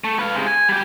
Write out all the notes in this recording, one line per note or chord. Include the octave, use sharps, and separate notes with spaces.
A3
B4 F5
C3 G#3
G#5
G3 G4